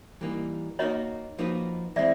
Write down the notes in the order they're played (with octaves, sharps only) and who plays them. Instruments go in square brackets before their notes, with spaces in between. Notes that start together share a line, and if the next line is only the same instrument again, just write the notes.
[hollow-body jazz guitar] E3 G3 A#3 D#4
[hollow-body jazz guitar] A#3 D#4 F#4 A#4 [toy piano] C#5 D#5
[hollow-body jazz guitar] F3 A#3 D#4 F#4 B4
[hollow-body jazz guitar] E3 G#3 C4 [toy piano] D5 E5